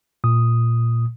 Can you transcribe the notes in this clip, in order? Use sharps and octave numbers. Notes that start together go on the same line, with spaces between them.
A#2 D#6